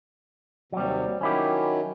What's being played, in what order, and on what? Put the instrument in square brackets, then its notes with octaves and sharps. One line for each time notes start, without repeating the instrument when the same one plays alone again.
[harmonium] D#2 C3 [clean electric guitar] F#3 G3
[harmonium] D#3 F#3 [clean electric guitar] C#4 E4 G4